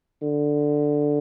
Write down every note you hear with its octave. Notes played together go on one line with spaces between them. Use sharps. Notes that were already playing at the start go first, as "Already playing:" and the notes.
D3